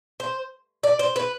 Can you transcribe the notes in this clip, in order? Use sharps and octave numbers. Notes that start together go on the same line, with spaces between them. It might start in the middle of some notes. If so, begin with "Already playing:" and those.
C5
D5
C5
B4